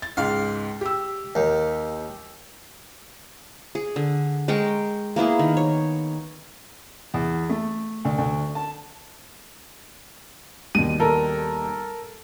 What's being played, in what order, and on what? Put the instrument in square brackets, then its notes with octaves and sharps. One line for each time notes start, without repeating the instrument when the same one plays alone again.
[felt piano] A6
[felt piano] C#2 G#2 [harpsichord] F5
[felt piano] G4 E6
[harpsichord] D#2
[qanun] G#4
D3
G#3 A#4 G5 C#6
A#3 B3 E4 G#4
D#3
C#5
[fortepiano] E2
A3
D2
D2
A5
[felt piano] D#2 B2 G3 [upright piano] D#7
[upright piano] A4 A#4